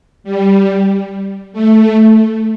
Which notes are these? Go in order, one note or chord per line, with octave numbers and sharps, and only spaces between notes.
G3
A3